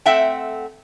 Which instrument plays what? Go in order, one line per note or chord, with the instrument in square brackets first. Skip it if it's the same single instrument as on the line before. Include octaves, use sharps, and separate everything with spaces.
[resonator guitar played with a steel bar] A3 C4 E5 F#5 G5